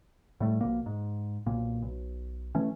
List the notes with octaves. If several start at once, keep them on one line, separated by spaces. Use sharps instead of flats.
A2 G3 A3
A#1 B2 A#3
G#2
B1 A#2 A#3
B1
E3 A3 C#4